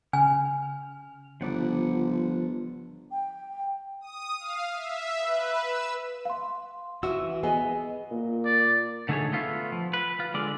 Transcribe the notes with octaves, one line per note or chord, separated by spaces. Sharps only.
C#3 G#5 F6
G1 F3 F#5 D6
G5
D#6
F5
E5
B4
E6
F5 C6
E3 F#4 E5 E6
B3 G#4 D#5 G#5
A#2
D5
D3 A3 D#4 G#4 A4 C#5
A3 B3 F4
F3
B4
F4
D3 G#3 D5